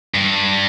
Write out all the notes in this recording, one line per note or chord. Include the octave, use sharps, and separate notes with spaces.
G2